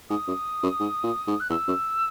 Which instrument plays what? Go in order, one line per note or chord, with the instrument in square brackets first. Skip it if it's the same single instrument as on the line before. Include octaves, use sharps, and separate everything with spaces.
[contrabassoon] G#2 [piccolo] D#6
[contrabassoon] F#2
F#2
G#2
A#2
G#2
[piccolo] F#6
[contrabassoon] E2 [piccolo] E6
[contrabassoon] F#2